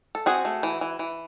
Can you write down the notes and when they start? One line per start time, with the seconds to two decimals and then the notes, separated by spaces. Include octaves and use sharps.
0.15 A4
0.26 C4 F#4 G#4
0.45 A3
0.63 E3
0.81 E3
0.99 E3